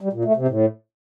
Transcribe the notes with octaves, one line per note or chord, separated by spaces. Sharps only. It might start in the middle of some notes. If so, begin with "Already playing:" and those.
G3
A#2
A3
C3
A2